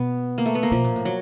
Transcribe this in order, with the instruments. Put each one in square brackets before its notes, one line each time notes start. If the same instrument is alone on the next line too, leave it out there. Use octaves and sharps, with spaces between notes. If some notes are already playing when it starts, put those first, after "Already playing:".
Already playing: [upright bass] B2 [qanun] B3
[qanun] A#3
A3
B3
A#3
[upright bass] B2 [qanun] F3
[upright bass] A#2
A2
[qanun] F#3